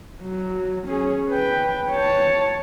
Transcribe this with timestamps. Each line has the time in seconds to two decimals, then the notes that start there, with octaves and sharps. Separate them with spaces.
0.22 F#3
0.88 C#4 G#4
1.29 B4 G5
1.91 C#5 A5